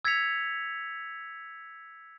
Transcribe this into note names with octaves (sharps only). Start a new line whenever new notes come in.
E6 G#6 A6 B6 C#7 F7